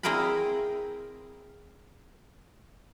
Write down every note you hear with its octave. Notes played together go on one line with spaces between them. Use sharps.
C4 E4 G#4 A#4 G5 B5